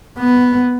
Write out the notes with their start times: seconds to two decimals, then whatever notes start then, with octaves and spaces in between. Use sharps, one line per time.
0.19 B3